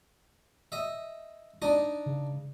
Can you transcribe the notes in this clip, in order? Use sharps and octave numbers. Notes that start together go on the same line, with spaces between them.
D#5 E5
D4 D#4 D#5
C#3